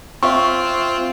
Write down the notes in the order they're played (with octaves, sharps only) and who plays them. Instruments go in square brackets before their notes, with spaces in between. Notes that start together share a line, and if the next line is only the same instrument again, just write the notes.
[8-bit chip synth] C4 F4 [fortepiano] E5 C#6